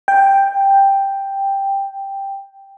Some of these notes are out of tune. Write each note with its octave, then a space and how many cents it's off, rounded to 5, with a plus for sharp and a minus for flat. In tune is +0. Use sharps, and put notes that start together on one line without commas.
G5 +5